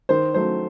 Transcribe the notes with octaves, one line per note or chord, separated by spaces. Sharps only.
D#3 C5
F#3 A3 C5